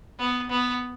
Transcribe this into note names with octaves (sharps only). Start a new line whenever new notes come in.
B3
B3